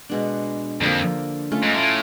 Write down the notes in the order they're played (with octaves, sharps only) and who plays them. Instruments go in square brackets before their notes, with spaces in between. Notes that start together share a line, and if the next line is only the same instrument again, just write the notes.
[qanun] B2 G#3 B3 D4
[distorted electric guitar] F2 [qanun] D3 F3 A#3
[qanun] A3 C#4 F4
[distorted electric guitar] G#2
A2